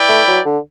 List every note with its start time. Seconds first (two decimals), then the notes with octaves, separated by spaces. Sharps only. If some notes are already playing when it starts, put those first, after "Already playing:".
Already playing: E4 B4 D5 G5
0.09 A3
0.28 F#3
0.45 D3